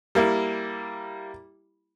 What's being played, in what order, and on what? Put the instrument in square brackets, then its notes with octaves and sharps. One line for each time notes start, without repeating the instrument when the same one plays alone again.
[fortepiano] G3 A#3 E4